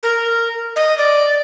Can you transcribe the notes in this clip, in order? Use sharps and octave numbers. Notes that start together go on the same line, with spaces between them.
A#4
D#5
D5